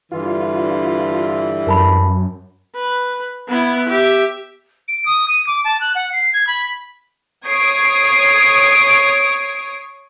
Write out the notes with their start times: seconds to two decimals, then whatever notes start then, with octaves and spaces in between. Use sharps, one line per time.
0.11 G2 D3 E3 F4
1.67 F#2 A#4 A5 B5
2.75 B4
3.48 B3 E4
3.89 G4 E5
4.88 D7
5.06 D#6
5.28 D#7
5.47 D6
5.65 A5
5.81 F#6
5.95 F#5
6.13 C7
6.33 G#6
6.47 B5
7.46 C#5 C#6 D#6 G#6 C7 D7